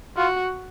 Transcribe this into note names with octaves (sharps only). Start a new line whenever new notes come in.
F4 F#4